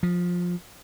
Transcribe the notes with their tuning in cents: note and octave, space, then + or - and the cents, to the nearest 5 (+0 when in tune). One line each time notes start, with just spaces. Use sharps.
F3 +15